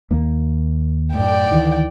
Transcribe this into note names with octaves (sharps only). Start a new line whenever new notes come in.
D#2 A#3
F#2 A2 D5 G5
D2 D#3 E3